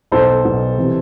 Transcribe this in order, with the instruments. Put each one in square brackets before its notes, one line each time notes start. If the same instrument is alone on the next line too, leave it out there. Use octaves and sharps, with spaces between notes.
[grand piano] B1 B2 A4 C5
B1 B2
C3 E3